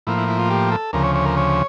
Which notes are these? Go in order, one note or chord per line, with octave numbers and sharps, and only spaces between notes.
A2 F3 A#3 E4
E4
E4
F4
G4
A4
D2 C#3 F3 A#4
C#5
C#5
A#4
C#5